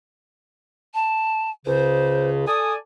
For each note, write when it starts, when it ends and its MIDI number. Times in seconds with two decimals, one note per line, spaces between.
0.94 1.51 81
1.66 2.44 37
1.66 2.44 49
1.66 2.29 72
2.47 2.75 69
2.47 2.75 74
2.47 2.75 80
2.47 2.73 87